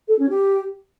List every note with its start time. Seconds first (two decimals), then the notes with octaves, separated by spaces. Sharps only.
0.08 A4
0.19 C#4
0.30 G4